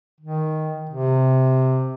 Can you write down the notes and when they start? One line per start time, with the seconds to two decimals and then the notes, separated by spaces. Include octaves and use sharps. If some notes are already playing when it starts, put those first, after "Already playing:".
0.21 D#3
0.90 C3